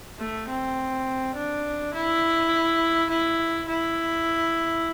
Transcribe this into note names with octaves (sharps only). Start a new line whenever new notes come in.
A3
C4
D4
E4
E4
E4